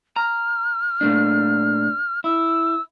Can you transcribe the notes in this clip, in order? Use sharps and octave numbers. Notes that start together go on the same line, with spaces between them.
A#5 F6
A#2 A3 D4
E4 E6